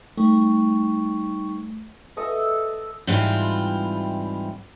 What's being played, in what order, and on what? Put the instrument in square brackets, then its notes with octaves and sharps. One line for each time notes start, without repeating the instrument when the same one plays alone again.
[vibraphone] G3 D#4 C#6 [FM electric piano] A3
[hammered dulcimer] A4 D#5 E5
[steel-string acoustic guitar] G#2 E3 G3 C4 E4 F4